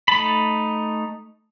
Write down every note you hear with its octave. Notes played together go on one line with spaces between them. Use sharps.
A3 D#4 A5 B5